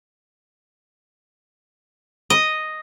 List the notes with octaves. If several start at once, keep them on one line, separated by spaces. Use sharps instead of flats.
D#5